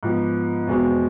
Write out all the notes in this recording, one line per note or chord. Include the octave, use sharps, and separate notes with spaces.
G#2 F3 B3
E2 B2 G#3 C4